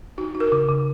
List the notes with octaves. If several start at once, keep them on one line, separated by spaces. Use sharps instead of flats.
D#4 F#4
D#4
A#4
C#3
C#3